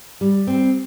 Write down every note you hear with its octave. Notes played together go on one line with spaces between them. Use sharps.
G3
C4